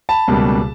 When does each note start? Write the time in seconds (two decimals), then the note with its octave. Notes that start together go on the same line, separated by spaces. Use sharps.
0.09 A5 B5
0.28 C#2 B2 G3 A#3